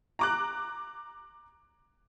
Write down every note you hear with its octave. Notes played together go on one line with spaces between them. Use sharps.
A#5 D6 F#6